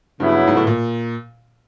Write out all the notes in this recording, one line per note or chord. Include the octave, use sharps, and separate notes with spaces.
G2 C#3 F#3 B3 E4
G#2
A2
A#2